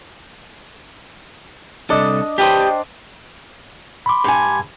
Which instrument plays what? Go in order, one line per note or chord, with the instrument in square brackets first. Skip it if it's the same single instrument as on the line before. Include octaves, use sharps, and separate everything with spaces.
[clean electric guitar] C2 A4 [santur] D4 D#5
[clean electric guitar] G4 B4 D#5 [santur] C5 G5 A5
[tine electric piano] B5 C6 D6
[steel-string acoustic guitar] G2 G#5